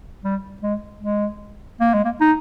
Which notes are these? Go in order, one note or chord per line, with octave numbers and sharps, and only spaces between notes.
G3
G#3
G#3
A#3
G#3
A#3
D#4